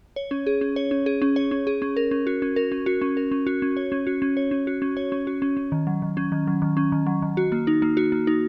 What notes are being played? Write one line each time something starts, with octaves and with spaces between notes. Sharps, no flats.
C#5
C#4
G#4
C#4
C#5
C#4
G#4
C#4
C#5
C#4
G#4
C#4
A#4
C#4
F#4
C#4
A#4
C#4
F#4
C#4
A#4
C#4
F#4
C#4
C#5
C#4
F#4
C#4
C#5
C#4
F#4
C#4
C#5
C#4
F#4
C#4
C#4
D#3
F#3
D#3
C#4
D#3
F#3
D#3
C#4
D#3
F#3
D#3
F#4
A#3
D#4
A#3
F#4
A#3
D#4